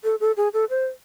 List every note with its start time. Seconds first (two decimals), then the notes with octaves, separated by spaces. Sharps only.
0.04 A4
0.20 A4
0.37 G#4
0.53 A4
0.70 C5